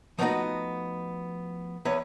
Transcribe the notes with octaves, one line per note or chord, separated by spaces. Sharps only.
F3 A3 B3 C4 D#4 F#4
E2 B4 C#5